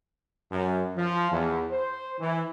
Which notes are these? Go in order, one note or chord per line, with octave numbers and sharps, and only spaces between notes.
F#2
F3
E2
C5
E3